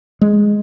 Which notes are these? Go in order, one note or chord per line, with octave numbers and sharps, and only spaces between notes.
G#3